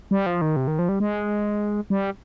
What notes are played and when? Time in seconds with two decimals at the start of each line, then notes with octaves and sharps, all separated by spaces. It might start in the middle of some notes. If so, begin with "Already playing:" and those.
0.11 G3
0.26 F3
0.41 D#3
0.56 C3
0.67 D#3
0.79 F3
0.89 G3
1.00 G#3
1.90 G3